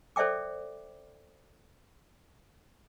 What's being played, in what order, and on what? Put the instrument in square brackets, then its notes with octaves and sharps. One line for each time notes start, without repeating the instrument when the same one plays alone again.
[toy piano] A4 C5 D5 E5 G5 D6